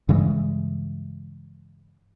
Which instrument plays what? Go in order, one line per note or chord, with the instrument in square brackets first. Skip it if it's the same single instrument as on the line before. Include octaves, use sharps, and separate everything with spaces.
[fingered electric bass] G2 C#3 E3 G#3